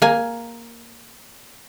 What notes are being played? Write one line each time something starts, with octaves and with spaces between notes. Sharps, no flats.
A#3 G#5